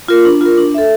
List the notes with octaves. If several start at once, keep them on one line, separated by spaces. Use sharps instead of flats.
F4 A#4
D4
F4 A#4
D4
A4 E5